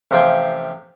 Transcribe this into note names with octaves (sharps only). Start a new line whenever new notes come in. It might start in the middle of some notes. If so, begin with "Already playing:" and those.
A1 C3 F3 F4 G5 G#5